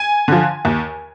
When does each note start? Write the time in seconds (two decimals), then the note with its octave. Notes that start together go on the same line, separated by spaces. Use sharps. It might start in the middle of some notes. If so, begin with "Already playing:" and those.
Already playing: G#5
0.28 D3 F3
0.65 D#2